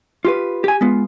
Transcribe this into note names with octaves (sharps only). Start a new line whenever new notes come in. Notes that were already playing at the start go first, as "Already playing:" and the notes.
F4 G4 B4
G4 G#5
G#3 B3 F4